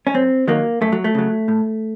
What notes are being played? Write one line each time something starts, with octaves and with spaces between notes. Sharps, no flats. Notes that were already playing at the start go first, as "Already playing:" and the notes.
C#4
F#2 C4
D#3 F#3 A#3
F#2 A3
F#3
A3
C#3 F#3
A2